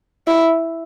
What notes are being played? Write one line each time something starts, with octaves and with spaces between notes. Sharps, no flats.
E4